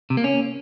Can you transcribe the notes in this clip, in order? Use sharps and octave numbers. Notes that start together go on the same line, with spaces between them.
C3
A#3
C#4